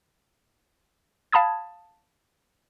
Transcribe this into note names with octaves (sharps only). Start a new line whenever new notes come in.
F5 A5 B5 D#6 G#6